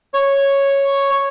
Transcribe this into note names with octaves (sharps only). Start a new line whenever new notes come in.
C#5